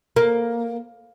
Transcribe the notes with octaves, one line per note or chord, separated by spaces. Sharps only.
A#3